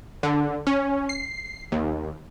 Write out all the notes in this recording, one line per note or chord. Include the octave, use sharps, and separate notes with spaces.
D3
C#4
C7
D#2